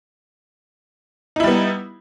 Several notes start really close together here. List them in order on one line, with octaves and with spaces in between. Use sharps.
D#4 E4 G3 B3